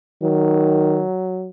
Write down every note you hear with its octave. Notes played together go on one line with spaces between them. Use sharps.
D#3 F#3